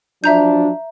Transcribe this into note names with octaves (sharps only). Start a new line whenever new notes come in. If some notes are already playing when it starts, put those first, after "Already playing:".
F3 F#3 D4 E5 A#5 G6